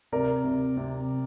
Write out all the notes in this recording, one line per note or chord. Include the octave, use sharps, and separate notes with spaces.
C3 A#4 D5
C3
C3